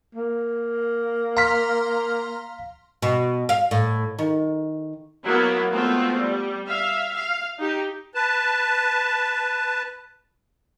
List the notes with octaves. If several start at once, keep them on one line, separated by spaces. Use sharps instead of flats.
A#3
F5 A#5 C6 F6 B6
B2
F5
A2
D#3
F#3 A#3 B3 E4
G#3 A3 B3 C4 F4
G3
E5 F5
F5
D#4 G4
B4 A5